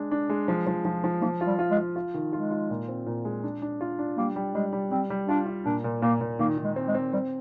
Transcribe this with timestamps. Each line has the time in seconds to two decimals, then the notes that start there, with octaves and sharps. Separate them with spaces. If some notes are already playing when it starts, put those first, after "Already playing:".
Already playing: G#3 D4
0.11 D4
0.29 G#3
0.48 F3
0.67 F3
0.85 F3
1.04 F3
1.21 F3 A#3
1.41 F4
1.47 G3
1.59 F4
1.71 G#3
1.77 F4
1.96 F4
2.14 D#3
2.33 G#3 F4
2.51 F4
2.70 A#2
2.88 C4
3.06 A#2
3.25 G#3
3.44 D4
3.62 D4
3.81 F4
3.99 D4
4.17 G3 A#3
4.36 G3
4.54 G3 G#3
4.73 G3
4.91 G3 C4
5.10 G3
5.29 D4 F4
5.47 F4
5.65 A#2 D4
5.84 A#2
6.02 A#2 A#3
6.21 A#2
6.39 D#3 A#3
6.58 D#3
6.64 G#3
6.76 C4
6.88 G#3
6.95 C4
7.13 G3 C4